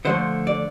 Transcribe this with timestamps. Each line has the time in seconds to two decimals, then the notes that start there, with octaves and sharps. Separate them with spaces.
0.05 D3 F3 A3 C5
0.47 D5